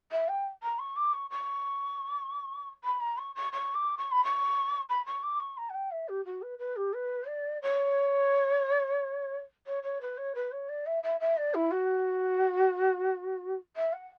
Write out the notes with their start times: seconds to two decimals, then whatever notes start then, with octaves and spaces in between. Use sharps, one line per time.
0.11 E5
0.28 G5
0.62 A#5
0.79 C#6
0.96 D6
1.13 C#6
1.30 C#6
2.84 B5
3.00 A#5
3.17 C#6
3.35 C#6
3.52 C#6
3.74 D6
3.97 C#6
4.11 B5
4.24 C#6
4.89 B5
5.06 C#6
5.23 D6
5.40 C#6
5.57 A#5
5.69 F#5
5.74 G5
5.91 E5
6.08 G4
6.25 F#4
6.42 B4
6.59 B4
6.76 G4
6.93 B4
7.27 D5
7.62 C#5
9.66 C#5
9.83 C#5
10.01 B4
10.17 C#5
10.35 B4
10.51 C#5
10.68 D5
10.86 E5
11.03 E5
11.20 E5
11.37 D5
11.54 E4
11.71 F#4
13.76 E5
13.93 F#5